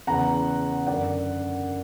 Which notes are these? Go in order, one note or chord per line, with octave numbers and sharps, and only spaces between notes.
E2 C#3 E3 F#5 A#5
F#2 D3 D5 F#5